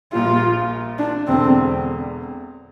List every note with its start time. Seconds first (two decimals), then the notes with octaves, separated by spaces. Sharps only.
0.13 A#1 A#2 G3 F4
0.99 D4
1.27 E1 E2 D3 C4